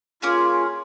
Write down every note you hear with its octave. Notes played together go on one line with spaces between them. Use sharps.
A#3 C#4 F4 G#4